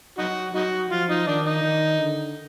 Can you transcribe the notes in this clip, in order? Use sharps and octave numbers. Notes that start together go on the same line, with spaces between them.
F#3 D#4 F#4
F#3 D#4 F#4
F3 F4
D#4
D#3 D4
D#4
D#3
D3